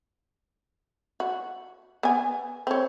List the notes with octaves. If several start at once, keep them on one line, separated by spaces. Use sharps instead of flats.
F#4
B3 G#5
C4 C#5